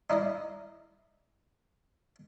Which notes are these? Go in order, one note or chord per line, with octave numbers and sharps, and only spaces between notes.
D#4 E4 D5 D#5